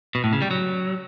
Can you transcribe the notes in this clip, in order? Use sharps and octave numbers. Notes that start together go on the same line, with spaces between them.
B2
A2
C#3
G3
F#3